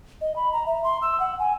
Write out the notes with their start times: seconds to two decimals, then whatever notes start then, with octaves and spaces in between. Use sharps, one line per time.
0.21 D#5
0.36 B5
0.52 A#5
0.67 E5
0.84 C6
1.02 E6
1.20 F#5
1.39 G#5